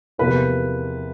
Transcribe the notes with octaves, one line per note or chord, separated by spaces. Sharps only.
E2 C3 F3 A#3 B4